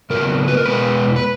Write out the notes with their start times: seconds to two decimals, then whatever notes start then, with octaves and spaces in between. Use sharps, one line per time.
0.10 C#3 F#3 B3 A#4
0.48 B4
0.57 A#4
0.66 B2 G#3 B3 B4
1.16 B4